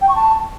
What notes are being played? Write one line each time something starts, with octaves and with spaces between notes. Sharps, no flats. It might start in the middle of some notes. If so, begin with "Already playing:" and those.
G5
C#6
A5